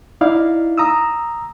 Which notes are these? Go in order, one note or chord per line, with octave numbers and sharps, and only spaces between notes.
D#4 E4 D5 F5
A#5 D#6 E6